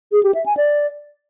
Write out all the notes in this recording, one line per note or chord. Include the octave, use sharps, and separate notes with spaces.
G#4
G4
E5
G#5
D5